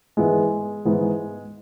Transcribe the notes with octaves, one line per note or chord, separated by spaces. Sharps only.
G#2 E3 G#3 B3 E4 G#4
G#2 E3 B3 E4 G#4